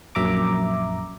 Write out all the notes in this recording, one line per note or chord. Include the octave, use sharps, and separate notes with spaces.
A#1 F#2 E5 A#5 D6